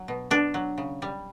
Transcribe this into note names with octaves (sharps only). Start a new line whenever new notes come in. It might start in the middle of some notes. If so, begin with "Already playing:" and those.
Already playing: F#3
B2
B2 D4
F#3
C#3
G3